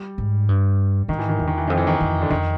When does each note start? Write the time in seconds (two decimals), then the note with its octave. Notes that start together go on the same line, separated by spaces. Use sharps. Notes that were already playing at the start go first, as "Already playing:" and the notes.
Already playing: G3
0.18 G#2
0.49 G2
1.08 G#2 D#3
1.19 E3
1.29 D#3
1.38 E2 E3
1.47 D#3
1.58 E3
1.68 F2 D#3
1.77 E3
1.87 D#3
2.01 F2
2.22 D3
2.30 F2 D#3